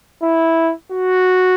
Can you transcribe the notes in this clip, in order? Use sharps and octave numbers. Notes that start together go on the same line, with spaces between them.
E4
F#4